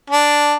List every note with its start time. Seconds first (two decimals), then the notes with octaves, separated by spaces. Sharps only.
0.10 D4